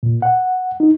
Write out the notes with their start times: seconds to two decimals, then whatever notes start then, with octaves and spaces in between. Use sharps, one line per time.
0.03 A#2
0.22 F#5
0.80 D#4